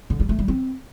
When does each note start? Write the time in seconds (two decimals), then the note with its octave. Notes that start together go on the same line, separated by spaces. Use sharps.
0.10 D3
0.20 G3
0.29 A3
0.39 G3
0.48 C4